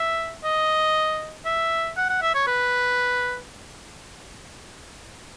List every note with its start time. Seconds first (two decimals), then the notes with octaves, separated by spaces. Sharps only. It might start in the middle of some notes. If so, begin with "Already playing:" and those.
Already playing: E5
0.44 D#5
1.45 E5
1.97 F#5
2.09 F#5
2.22 E5
2.34 C#5
2.47 B4